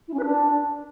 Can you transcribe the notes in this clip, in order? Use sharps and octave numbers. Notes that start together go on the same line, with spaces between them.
E4
C#4
B4
D4